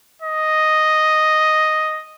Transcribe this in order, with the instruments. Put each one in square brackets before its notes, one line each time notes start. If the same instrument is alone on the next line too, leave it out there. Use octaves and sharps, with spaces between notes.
[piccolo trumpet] D#5